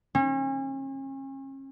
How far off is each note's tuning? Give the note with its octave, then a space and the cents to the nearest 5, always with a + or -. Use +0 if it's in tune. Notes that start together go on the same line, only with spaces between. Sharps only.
C#4 -40